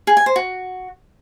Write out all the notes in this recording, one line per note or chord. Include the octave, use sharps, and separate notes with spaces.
G#4
G#5
C5
F#4